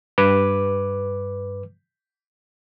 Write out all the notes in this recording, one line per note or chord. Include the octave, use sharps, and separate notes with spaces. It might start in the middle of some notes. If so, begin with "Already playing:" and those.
G2 B4 D6